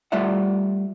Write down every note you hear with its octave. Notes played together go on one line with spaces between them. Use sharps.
G3 A3 F4 D5 E5 F#5